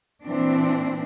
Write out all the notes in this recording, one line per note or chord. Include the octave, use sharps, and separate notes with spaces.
A#2 E3 C4 D4